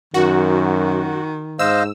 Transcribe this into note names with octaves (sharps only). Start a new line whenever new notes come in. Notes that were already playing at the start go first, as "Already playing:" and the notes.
F#2 D#3 F#4
G#2 C5 D#5 F5 E6